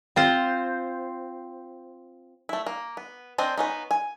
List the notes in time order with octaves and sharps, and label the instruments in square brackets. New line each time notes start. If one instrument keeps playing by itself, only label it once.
[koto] C4 F4 C5
[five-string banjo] A3 E4
A#3
B3
C4 D4 C5 D#5
B3 C#4 D#4
G#5